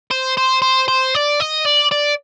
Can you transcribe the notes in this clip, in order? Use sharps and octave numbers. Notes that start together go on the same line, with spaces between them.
C5
C5
C5
C5
D5
D#5
D5
D5